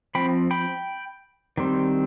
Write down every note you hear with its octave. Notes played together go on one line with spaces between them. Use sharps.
F3 C4 G5 B5
G5 B5
D#3 G3 C4